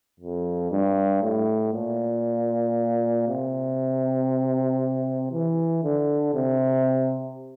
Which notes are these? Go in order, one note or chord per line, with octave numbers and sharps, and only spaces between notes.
F2
G2
A2
A#2
C3
E3
D3
C3